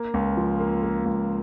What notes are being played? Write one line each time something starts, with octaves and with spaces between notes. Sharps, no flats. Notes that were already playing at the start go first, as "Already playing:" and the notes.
Already playing: A#3
C#2
F3
A#3
A#3
C#2